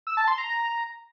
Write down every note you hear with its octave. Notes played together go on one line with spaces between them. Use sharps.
E6
A5
C6
A#5